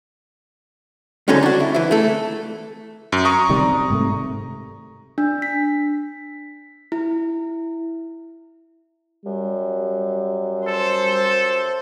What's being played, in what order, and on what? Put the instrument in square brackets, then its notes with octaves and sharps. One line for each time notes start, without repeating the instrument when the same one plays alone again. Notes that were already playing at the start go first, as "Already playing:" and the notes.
[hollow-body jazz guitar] C2 D3 F#3 C#4 D#4 A4
D4 F#4
E4
E3 E4
A3 A4
[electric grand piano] F#2
A#5 C#6 D#6
[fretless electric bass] C3 D#3 G3
G#2 C3 A3
[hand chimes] D4
B6
E4
[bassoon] F#2 [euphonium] G3
[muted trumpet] A4 [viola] C5